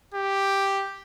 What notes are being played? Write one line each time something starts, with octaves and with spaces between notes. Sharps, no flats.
G4